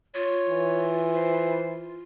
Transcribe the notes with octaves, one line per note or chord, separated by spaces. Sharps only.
F4 C#5
E3
C5